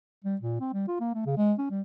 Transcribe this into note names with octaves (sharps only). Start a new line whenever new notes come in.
G3
A#2
C4
G3
F4
A#3
A3
C#3
G#3
C#4
G3